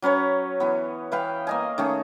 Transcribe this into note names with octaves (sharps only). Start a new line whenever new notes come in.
F#3 C#4 B4 C#5
E3 B3
E3 B4 F5 G5
A#3 D#5 G#5
D#3 A3 C#4 G#4